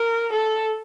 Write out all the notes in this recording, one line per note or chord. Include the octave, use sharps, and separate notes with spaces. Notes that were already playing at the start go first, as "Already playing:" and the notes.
Already playing: A#4
A4